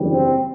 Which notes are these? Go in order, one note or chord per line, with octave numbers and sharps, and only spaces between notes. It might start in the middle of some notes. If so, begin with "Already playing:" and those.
Already playing: F#1 E2 D3 G3
C4